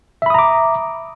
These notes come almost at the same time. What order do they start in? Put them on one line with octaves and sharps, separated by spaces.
E5 B5 D#6 A#5 D6